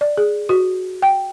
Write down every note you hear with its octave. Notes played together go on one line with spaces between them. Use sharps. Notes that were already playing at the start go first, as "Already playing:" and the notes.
D5
G#4
F#4
G5